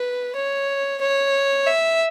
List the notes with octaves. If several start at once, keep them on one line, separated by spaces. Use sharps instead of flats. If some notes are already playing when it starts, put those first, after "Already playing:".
Already playing: B4
C#5
C#5
E5